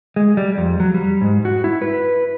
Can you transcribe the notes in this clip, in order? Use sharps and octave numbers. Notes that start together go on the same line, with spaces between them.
G#3
G3
F2
F#3
G3
G#2
F#4
E4
B4